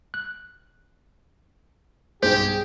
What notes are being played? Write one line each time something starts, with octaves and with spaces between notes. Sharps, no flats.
F#6
B1 G2 G#3 G4 G#4 C5 G5